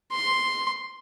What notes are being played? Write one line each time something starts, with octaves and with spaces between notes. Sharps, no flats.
C6